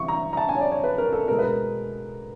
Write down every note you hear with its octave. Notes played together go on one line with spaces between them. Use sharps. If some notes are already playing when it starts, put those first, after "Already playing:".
Already playing: C3 E3 C#6
A#5
A#5
A5
G#5
C#5
D5
C#5
B4
A#4
A4
B2 G#3 B3 A#4
B4
A#4